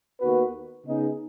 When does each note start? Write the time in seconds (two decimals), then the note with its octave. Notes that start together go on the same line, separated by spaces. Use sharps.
0.20 D#2 D#3 B3 F#4 B4
0.85 C#3 B3 D#4 G#4